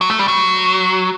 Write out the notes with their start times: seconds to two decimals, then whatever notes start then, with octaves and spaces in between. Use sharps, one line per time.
0.01 F#3
0.10 A3
0.19 G3
0.28 F#3